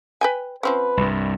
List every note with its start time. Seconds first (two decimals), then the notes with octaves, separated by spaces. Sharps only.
0.21 B4 G5 G#5
0.63 F3 C4 C#4 B4
0.97 C2 G2